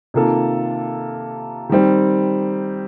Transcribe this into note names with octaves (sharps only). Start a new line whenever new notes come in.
C3 D#3 A#3 F4 A4
D#3 G3 C4